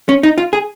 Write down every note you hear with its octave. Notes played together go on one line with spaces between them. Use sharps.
C#4
D#4
F4
G#4